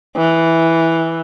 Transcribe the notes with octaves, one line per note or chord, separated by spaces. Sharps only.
E3